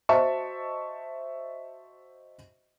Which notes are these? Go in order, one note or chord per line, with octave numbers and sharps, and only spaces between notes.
F#4 C5 D#5 E5 A5 C#6